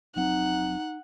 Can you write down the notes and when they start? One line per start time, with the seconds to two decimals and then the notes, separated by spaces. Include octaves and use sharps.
0.16 F1 F#3 C4 D#4 F#5